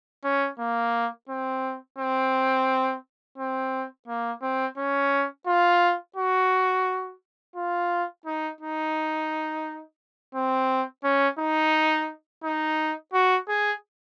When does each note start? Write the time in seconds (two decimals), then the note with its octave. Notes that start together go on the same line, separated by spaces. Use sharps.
0.24 C#4
0.59 A#3
1.29 C4
1.99 C4
3.38 C4
4.08 A#3
4.42 C4
4.77 C#4
5.47 F4
6.16 F#4
7.56 F4
8.26 D#4
8.61 D#4
10.35 C4
11.04 C#4
11.39 D#4
12.44 D#4
13.13 F#4
13.48 G#4